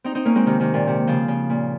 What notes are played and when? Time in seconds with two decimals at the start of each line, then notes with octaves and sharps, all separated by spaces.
0.04 C4 D#4
0.15 C4 D#4
0.25 A#3 C#4
0.35 G#3 C4
0.46 C3 D#3
0.60 C3 D#3
0.74 A#2
0.87 C3
1.07 C#3 F3
1.28 C#3
1.50 A#2